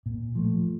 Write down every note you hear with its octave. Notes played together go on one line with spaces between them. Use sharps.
A#2
F3 A3